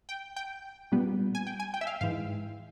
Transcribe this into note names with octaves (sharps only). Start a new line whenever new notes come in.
G5
G5
A#2 G3 B3
G#5
G5
G#5
G5
E5
F5
G#2 E3 G#3 F5